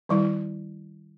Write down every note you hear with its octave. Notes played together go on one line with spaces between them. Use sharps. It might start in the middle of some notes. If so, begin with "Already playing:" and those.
D#3 G3 E4